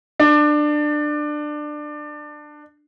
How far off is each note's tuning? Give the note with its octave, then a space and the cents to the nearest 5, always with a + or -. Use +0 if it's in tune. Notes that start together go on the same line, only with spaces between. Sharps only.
D4 +20